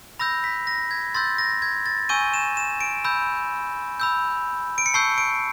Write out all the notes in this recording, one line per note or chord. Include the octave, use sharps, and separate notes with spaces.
B5 E6 G6 A#6
B6
A#6
G#6
C6 E6 G6 A6
A#6
G#6
A6
G#5 C#6 E6 G6 D#7
E7
E7
D7
B5 E6 G6
B5 E6 G6
D7
C#7
A5 C#6 E6 G6 C7
D7